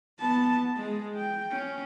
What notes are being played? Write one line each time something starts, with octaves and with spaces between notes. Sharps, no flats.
B3 A5
G#3 G#4
G5
C#4